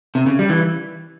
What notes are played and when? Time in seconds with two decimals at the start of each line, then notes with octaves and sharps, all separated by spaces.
0.15 C3
0.26 C#3
0.39 G3
0.50 E3